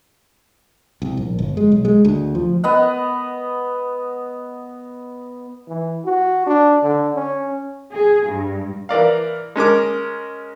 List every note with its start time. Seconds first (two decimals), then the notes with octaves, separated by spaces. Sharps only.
1.02 C2
1.17 A#1
1.39 G1
1.57 G#3
1.72 B1
1.85 G#3
2.05 D2
2.35 F3
2.64 B3 D#5 F#5
5.68 E3
6.05 F#4
6.46 D4
6.83 D3
7.15 C#4
7.94 G#4
8.28 G2
8.89 E3 A#4 D5 F5
9.56 G#3 C#4 A#4 D6